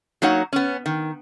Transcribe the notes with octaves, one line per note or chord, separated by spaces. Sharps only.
F#3 A#3 D#4 C#5 F#5
B3 C#4
D#3